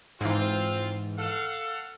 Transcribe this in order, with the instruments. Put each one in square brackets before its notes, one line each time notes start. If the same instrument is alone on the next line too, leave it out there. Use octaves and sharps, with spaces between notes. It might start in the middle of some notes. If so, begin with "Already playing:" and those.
[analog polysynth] G#2 E3 [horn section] C4 F4
[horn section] A4 F5 F#5